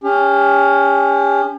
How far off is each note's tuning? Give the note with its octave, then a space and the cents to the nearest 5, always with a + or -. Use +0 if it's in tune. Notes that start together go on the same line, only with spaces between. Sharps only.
C#4 +25 G4 +40